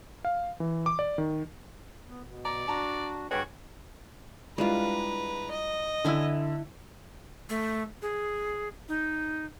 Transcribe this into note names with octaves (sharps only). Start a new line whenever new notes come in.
F5
E3
D6
D5
D#3
B3
B2
D5 A#5
D4 F#4 A5 A#5
G2 F#4 G#4 B4 C#5 G5
G3 G#3 D4 E4 F4 B4 A#5
D#5
D3 E4 G#5 A5 E6
A3
G#4
D#4